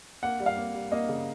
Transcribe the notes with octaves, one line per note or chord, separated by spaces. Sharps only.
A#3 F#5
G3
F5
A#3
G3
A#3 D#5
C#3